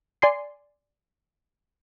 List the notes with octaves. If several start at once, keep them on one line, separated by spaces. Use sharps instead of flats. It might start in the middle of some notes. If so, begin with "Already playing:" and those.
D5 G#5 C6 C7